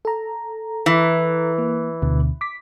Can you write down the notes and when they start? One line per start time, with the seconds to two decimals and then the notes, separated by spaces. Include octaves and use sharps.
0.05 A4 A#5
0.86 E3
1.58 A#3
2.02 D2 B2 D3
2.41 D6 B6